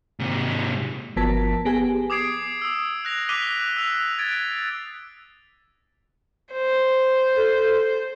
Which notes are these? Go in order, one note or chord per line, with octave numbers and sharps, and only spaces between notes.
G#2 C3
G1 F3 B3 A#4 A5 B6
B3 G4 G#4 G#5
D6 D#6 G#6 C7 D7
D#6 E6
F#6 A#6 F7
D6 F#6 B6 D#7 F7 G7
E6 F7
G#6 A6 D7
C5
A4